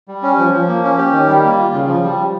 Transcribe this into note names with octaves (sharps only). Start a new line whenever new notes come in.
G3
C#4
F3
F3
A#3
C#4
G4
D#3
G3
A#3
F4
C#3
F3
G3